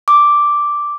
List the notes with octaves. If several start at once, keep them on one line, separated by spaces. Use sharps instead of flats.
D6